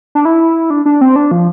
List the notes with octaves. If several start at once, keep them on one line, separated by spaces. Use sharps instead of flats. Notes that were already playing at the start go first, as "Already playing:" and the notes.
D4
E4
D4
D4
C4
D4
F3